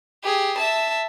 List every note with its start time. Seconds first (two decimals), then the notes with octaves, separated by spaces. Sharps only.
0.24 G4 G#4
0.58 E5 A5